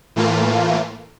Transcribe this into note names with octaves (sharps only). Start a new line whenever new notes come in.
A2 E3 A3 A#3 F4